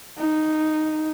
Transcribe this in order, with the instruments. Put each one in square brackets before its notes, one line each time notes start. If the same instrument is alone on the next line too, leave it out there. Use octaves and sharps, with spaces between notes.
[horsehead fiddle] D#4